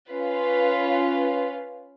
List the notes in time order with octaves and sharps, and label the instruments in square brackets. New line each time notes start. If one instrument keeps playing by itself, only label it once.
[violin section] C#4 F4 B4 F5